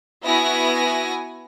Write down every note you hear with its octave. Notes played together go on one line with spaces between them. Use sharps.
B3 E4 F#4 B4 G#5 A#6